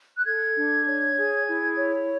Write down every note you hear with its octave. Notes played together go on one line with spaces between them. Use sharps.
F#6
A4 G#6
D4
C#5
G#4
E4
C#5